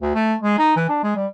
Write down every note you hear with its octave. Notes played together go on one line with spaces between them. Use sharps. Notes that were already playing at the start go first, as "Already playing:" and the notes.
D2
A3
G#3
D#4
E3
D4
G#3
G3